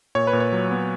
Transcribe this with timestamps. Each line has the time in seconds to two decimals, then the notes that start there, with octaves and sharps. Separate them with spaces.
0.15 A#2 C#5
0.27 B4
0.33 A#2
0.40 C#5
0.52 F#3
0.71 B3